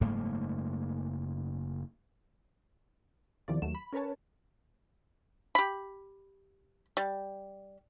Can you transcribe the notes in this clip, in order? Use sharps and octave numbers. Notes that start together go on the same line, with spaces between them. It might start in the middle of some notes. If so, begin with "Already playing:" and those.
F#1 G#2 A3 A#3
E2 C3 D#3 F3 D5
D#2 F#3 A3 E7
B5
C#4 A#4 B4 C#5 A5
G4 B5
G3